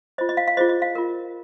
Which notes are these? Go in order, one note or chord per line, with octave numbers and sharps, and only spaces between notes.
F4 C5 D#5
D#5
F5
F5
F4 G#4 C5 D#5
D#5
F5
F4 A#4